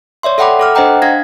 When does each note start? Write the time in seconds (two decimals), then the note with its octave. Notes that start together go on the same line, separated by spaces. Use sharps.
0.23 C#5 D5 E5 C6
0.38 A4 E5 F#5 G5 B5 D6
0.60 A4 D6 F6
0.75 D4 C5 D#5 F#5 G5 A#5
1.02 D4 F5 G#6 A#6